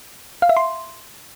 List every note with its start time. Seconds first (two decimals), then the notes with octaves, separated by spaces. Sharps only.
0.42 F5
0.49 E5
0.57 C6